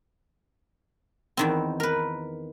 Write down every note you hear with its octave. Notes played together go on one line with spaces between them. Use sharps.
E2 D#3 C4
A#4 B4